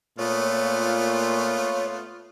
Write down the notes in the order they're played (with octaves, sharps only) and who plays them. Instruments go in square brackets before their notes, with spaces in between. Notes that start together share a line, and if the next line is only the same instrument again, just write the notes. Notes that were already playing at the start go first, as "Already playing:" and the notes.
[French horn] A#2 [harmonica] A3 B3 [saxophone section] F4 [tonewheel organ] C#5